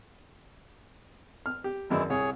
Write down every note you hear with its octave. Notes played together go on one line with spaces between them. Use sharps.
F6
G4
G#1 F#2 E3 G#3 E4 D5
C2 G#4 C#5